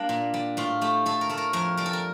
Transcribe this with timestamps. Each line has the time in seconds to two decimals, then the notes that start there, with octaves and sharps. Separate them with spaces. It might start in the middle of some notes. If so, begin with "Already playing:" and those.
Already playing: G3 A#3 D4
0.09 A#2
0.34 G3
0.57 A2 F4
0.82 A3 G4
1.06 A2 A4
1.21 A#4
1.30 A3 A4
1.37 A#4
1.53 F2 A#4
1.77 G3 A#4
1.86 A4
1.93 A#4